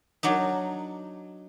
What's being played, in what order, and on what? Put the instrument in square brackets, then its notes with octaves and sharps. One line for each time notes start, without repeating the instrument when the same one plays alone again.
[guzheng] F#3 D4 D#4